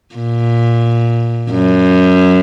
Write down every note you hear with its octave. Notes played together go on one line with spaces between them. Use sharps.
A#2
F#2